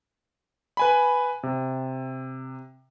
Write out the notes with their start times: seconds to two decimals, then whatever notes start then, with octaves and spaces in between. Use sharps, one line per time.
0.77 B4 G#5 B5
1.43 C3